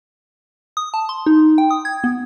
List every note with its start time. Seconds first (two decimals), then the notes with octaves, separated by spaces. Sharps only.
0.77 D#6
0.94 A5
1.09 C6
1.26 D#4
1.58 G5
1.70 D#6
1.85 G#6
2.04 B3